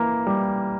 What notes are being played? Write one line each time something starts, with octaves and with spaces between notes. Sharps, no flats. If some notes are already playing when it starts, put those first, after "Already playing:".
Already playing: E3 A#3
G3